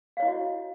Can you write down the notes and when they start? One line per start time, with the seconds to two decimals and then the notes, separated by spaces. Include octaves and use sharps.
0.17 F5
0.20 C#5
0.22 E4
0.25 D#5
0.28 F#4